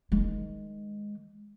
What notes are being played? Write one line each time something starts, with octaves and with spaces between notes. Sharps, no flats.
D#3 G#3